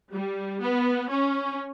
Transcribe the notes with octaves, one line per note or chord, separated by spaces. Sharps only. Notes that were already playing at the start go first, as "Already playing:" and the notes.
G3
B3
C#4